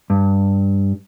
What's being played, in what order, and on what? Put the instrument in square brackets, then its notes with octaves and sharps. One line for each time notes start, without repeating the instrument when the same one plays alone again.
[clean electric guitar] G2